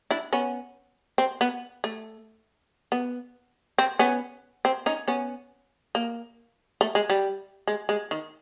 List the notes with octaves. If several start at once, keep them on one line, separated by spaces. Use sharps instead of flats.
D4 E4
B3 C#4
C4
B3
A3
B3
C4
B3 C#4
C4
C#4 D#4
B3 C#4
A#3
A3
G#3
G3
G#3
G#3
D#3